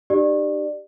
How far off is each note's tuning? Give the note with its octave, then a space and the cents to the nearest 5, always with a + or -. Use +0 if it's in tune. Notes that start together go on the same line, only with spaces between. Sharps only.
D#4 -45 G4 +0 D5 +20